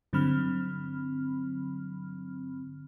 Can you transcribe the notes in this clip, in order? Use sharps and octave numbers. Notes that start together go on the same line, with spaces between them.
G2 D3 F#3 C4 B5 F6